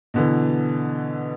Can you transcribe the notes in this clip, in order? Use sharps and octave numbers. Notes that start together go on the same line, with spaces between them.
B2 D3 E3